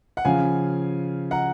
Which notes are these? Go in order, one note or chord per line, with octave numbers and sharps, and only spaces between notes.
F#5
C#3 F3 F5 G#5
F#5 A#5